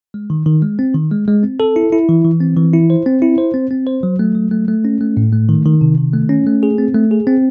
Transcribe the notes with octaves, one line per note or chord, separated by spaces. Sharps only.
G#3
D#3
D#3
G#3
C4
D#3
G#3
G#3
C4
A4
E4
E4
E3
E3
C4
E3
E4
C5
C4
E4
C5
C4
C4
C5
F#3
A3
F#3
A3
A3
C#4
A3
A2
A3
D#3
D#3
C3
D#3
A3
C#4
A3
G#4
C4
A3
G#4
C4